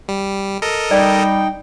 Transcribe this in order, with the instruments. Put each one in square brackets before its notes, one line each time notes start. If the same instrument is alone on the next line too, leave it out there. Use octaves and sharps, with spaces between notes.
[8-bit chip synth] G3
A4 A#4 D#5
[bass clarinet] G3 [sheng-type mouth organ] D#4 G5 [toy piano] D5